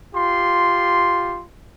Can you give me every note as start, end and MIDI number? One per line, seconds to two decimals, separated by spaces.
0.15 1.43 65
0.15 1.43 67
0.15 1.43 84